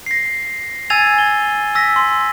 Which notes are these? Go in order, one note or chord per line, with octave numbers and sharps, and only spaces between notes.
A#6 C7
G#5 E6 G#6 A6 D#7 F7
G7
E6 A#6 B6
C6